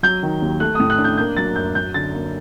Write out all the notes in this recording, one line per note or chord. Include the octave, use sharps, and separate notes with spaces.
F#3 G6
D#3
D#2
A3 F#6
D#6
A2
F#6
D4
G6
A#3 G6
F#3 A6
F#2 G6
F#3 G6
D3 A6
A#3